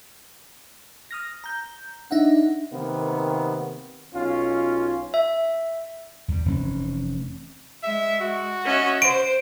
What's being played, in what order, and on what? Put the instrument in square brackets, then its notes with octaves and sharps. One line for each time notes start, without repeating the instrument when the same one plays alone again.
[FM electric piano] D#6 F6 A#6
A#5 G6
[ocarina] D4 [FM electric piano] D#4 E5 F#5
[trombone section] C3 D#3 A#3 B3
B1 C#4 F4
[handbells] E5
[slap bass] E2 G3
F1 E3 C#4
[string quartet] G#3 [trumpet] E5
[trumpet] F#4
[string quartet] C#4 D#5 E5
[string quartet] C5 [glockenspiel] D7